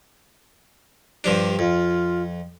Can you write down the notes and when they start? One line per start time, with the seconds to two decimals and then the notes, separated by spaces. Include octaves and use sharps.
1.24 G2 F3 D4 G4
1.59 F2 F4